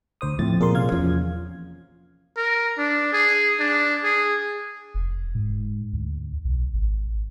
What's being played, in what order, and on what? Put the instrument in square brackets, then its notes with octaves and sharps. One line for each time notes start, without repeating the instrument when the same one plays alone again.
[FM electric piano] D2 C5 D#6
[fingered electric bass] A2 [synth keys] F3 C4 [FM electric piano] A6
[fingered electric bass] A#2 [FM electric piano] G#4 A#4 C6
[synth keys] C3 C#4 [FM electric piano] F5 G#6
[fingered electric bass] E2 F3 [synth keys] C#4
[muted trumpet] A#4
D4
G#4
D4
G#4
[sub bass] F1
G#2
D2
B1
G#1